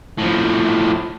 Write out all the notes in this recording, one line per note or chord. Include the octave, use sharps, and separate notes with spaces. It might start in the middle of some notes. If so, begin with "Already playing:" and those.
A2 F3